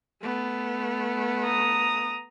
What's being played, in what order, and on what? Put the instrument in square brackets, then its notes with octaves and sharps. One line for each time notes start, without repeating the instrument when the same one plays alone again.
[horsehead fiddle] A3 B3
[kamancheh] A#5 D#6